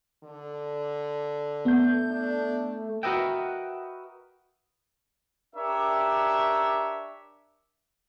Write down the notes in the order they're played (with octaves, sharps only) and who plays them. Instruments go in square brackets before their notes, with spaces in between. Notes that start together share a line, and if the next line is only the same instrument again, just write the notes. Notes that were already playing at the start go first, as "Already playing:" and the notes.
[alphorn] D3
[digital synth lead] A3 [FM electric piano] B3 G6
[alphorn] D4
[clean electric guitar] F#4 A#4 B4 D#5 E5 G5
[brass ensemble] D4 G4 A#4 C#5 E5